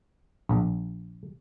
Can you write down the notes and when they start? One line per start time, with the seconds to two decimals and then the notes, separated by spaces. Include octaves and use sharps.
0.49 A#1